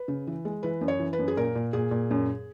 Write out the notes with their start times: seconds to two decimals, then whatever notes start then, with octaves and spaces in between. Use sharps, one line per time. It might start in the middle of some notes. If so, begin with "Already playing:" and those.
Already playing: B4
0.08 C#3
0.27 E3
0.45 G#3
0.63 E3 B4
0.81 F#2
0.88 C#5
1.00 E3
1.13 B4
1.19 F#2
1.28 G#4
1.37 A#2 A#4
1.55 A#2
1.73 A#2 G#4
1.91 A#2
2.11 F#2